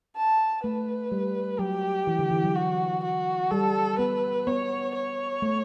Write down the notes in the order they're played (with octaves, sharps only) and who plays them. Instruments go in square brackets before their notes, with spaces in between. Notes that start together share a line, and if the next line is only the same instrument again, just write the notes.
[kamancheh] A5
[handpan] A3 [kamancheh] B4
[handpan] G3
[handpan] F#3 [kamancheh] G4
[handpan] E3
D3
E3
F#3
[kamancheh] F#4
F#4
[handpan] G3 [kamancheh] A4
[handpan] B3 [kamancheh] B4
[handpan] B3 [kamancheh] C#5
[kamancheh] C#5
[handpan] A3